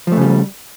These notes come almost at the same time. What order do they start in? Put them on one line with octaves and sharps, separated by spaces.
F3 A3 C#3 G3